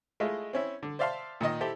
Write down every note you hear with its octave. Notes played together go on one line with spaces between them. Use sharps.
G#3 A3 E4 F4 D#5
C4 C#4 E4
D3
C5 D5 E5 F5 A5 C6
A#2 D#3 D#4 D#5
E4 G4 A4 C5